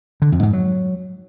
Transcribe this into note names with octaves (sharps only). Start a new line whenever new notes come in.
D3
F2
G#2
F#3